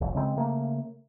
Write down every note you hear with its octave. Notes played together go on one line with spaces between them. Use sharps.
F1 C2
C#3 G#3 A#3 C4
C#3 A3 A#3